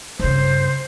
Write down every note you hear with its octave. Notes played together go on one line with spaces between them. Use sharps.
G2 C#3 C5